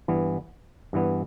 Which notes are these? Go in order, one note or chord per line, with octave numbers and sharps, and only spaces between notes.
G2 E3 B3
G2 E3 B3